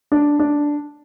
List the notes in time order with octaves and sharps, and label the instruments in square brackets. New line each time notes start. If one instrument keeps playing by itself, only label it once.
[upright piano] D4
D4